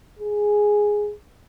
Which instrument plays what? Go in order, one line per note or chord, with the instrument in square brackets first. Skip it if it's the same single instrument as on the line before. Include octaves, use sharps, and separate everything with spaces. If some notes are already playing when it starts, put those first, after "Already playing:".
[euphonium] G#4